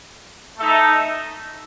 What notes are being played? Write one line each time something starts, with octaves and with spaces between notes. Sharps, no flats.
A3 D#4 A4 E5